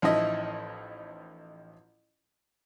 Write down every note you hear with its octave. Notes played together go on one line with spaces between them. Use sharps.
A1 F3 D#4 E4 D#5